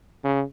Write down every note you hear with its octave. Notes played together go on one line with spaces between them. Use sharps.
C#3